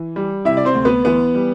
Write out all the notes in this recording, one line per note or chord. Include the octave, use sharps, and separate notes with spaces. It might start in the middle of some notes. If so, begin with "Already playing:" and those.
Already playing: E3
G3
C3 E4 E5
D5
C4 C5
D2
B3 B4
E3 B3 B4
G3